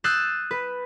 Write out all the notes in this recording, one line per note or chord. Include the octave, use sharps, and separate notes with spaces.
D#6 E6 F#6 G6 A6 C7
B4